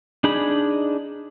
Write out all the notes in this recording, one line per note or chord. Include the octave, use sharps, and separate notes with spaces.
D4 D#4 G#4 B5